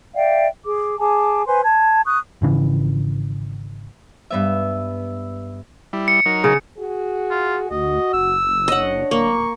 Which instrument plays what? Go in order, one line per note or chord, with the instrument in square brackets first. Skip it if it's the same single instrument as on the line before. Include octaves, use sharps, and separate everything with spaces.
[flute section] D5 E5 F5 G5
G#4 D6
G#4 G#5 A5 D6
B4 C5 G#5 C6
A5 G#6
C#6 D#6 F#6
[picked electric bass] G#1 C#3 E3
[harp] G2 B3 E5
[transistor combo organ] G3 E4
[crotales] C#7
[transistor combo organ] F#3 D#4 A#4
[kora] C#3
[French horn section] F#4 G#4
[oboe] F4
[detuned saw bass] D2 [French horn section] F#4 [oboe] D#5
[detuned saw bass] F#1 [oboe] E6
[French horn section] D4 C#5 [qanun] D#5 F#5
[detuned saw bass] D1 [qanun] A#3 [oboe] C#6